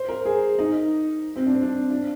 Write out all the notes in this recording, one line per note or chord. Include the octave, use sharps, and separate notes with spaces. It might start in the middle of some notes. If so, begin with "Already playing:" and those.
Already playing: C5
A#4
G#4
D#4
C4
D4
C4
D4
D4